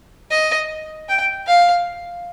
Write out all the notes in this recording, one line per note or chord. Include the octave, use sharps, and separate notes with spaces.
D#5
G5
F5